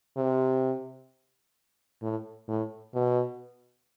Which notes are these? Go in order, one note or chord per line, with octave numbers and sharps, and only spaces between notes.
C3
A2
A2
B2